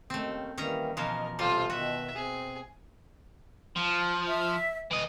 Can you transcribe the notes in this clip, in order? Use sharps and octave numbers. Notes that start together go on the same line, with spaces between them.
D#2 D#3 A3 C4 C#4
D#3 E3 G3 A#3 C#4 A#5
B2 E3 F3 A#4 D#5
C3 G3 F4 A4 C5
B2 D#3 F#4 E5
C4 G#4
F3
E5
E3 D#5